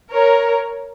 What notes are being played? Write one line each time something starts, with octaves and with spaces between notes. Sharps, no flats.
A#4 C#5